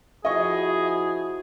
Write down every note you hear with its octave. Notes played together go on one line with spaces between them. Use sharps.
F3 E4 F#4 G#4 D#5 C#6